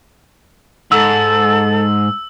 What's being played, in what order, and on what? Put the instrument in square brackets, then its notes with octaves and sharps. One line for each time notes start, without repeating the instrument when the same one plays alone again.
[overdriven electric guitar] G#2 [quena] A4 [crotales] E6